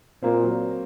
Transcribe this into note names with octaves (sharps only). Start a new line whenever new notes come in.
A#2 A#3 C4
F#3